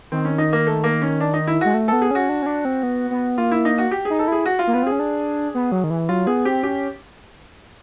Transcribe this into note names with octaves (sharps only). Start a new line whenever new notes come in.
D#3 C4
C#4
D#4
A#3
A3
A#3
C#4
D4
D#4
E4
G#3 F#4
A3
B3 A4
G#4
C#4 F#4
D4
C#4
D4
C4
B3
B3
A#3 F4
E4
D#4
F#4
G4
D#4 G#4
A4
E4 G#4
F#4
F4
A#3
B3 F4
C4
G#4
C#4
D4
B3
F#3
D#3
E3
F#3 F4
B3 G#4
C4 G4
C#4 G4